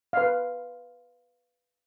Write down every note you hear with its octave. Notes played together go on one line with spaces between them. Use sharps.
B4 F5